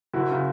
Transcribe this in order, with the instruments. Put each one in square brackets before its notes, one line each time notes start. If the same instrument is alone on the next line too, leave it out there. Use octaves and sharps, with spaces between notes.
[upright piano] F#1 E4 F#4
C#3